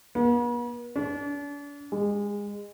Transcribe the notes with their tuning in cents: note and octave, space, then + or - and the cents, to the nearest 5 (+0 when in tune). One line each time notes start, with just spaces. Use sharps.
B3 -45
D4 -40
G#3 -25